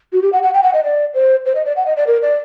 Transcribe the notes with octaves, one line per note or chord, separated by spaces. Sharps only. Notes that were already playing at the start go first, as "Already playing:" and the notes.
F#4
G4
F#5
F#5
G5
F#5
D#5
D5
C5
C5
D#5
D5
F#5
D#5
D5
A#4
D5